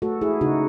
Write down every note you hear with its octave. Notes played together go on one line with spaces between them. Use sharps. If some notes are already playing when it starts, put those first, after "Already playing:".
A3 F#4 A4
E4 G#4
C#3 D#4 F#4